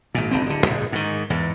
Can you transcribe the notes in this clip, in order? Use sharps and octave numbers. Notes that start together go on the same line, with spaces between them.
G#1 A#2
G1 D3 C4
D1 D3
A#1 G#2
G#2 D#3
E2 G#2